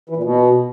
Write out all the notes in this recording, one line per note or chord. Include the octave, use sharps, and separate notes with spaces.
E3
A#2
B2